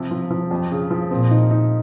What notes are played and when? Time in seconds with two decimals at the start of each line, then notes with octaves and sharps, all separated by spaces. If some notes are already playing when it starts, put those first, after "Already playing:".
Already playing: C3 F3
0.11 F3
0.30 F3
0.51 F2
0.71 C#3
0.91 F3
1.10 A#2 C4
1.31 D#4
1.51 D#4